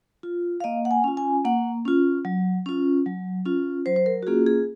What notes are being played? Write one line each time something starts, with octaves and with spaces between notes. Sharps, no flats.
F4
F5
A#3 D#5
F#5
G#5
C#4 F4
G#5
A#3 F#5
C#4 F4
F#3
C#4 F4
F#3
C#4 F4
F#3 C5
C5
A#4
F#4
A#3 C#4 F4 G#4
G#4